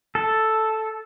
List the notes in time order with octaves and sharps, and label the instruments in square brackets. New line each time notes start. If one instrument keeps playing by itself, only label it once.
[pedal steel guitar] A4